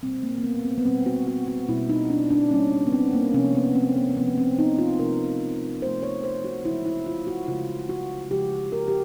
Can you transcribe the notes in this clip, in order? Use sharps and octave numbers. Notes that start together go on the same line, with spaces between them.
B2 G3 A#3 C4
A#3
A#3
B3
C4
B3
B2 G3 A#3 C4
F#4
F#4
F#4
B2 G3 A#3 E4
D#4
D4
D4
B2 G3 A#3 C#4
B3
C4
A#3
C3 F3 A3 C#4
B3
C4
B3
C3 F3 A3 B3
C4
D#4
F4
C3 F3 A3 A#4
C3 F3 A3 C5
C#5
C5
F#4
C#3 F3 G#3 E4
E4
F4
F#4
C#3 F3 G#3 F4
F#4
C#3 F3 G#3 G4
A#4
G4